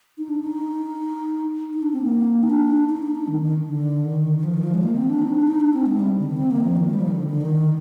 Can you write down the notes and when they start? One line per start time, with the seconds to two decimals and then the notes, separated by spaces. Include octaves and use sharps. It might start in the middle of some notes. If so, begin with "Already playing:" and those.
0.18 D#4
0.29 D4
0.41 D#4
1.73 D#4
1.82 D4
1.93 C4
2.02 A#3
2.43 D#4
2.50 D4
2.89 D#4
3.03 D#4
3.15 D4
3.28 D#3
3.41 D#3
3.67 D3
4.05 D#3
4.39 D#3
4.44 F3
4.54 D#3
4.63 F3
4.74 G#3
4.83 A#3
4.96 C4
5.09 D4
5.22 D#4
5.35 D4
5.47 D#4
5.60 D4
5.74 C4
5.86 G#3
5.99 G3
6.19 D3
6.28 D#3
6.37 C4
6.51 A#3
6.63 F3
6.77 D#3
6.88 G#3
6.94 G3
7.01 F3
7.08 D#3
7.15 D3
7.28 D3
7.41 D#3